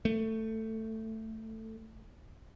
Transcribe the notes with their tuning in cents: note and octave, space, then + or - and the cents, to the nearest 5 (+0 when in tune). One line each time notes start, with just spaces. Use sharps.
A3 +10